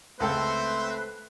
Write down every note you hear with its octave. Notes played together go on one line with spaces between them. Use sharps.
C#2 A3 C4 A4 B4 C5 G5